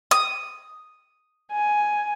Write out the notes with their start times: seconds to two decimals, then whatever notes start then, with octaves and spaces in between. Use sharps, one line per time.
0.11 D#6
1.52 G#5